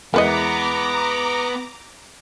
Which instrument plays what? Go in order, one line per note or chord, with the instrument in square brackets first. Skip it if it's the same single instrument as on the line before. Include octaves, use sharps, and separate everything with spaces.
[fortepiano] E2 G#3 [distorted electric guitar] B3 [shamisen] A#4 B4 D#5 [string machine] A#5 D6